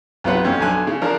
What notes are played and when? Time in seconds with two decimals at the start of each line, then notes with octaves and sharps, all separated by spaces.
0.24 B1 C3 F4 B4 F#5
0.45 F2 C#4
0.60 B1 D3 G#5 F#6
0.87 C#3
1.01 F3 D4 A#4